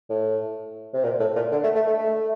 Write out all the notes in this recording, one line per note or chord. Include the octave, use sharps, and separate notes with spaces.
A2
C3
A#2
A2
A#2
D3
A3
A3
A3
A3